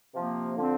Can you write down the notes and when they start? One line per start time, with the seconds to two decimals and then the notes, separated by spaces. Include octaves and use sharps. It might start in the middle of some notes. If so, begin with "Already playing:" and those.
0.14 C3 F3 A#3
0.57 D3 F3 C4